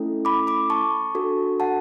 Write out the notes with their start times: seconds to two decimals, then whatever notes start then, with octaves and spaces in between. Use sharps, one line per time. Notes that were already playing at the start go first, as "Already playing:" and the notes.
Already playing: A3 C#4 E4 A4
0.25 B5 D6
0.47 B5 D6
0.70 A5 C#6
1.15 D4 F#4 A4
1.60 F#5 A5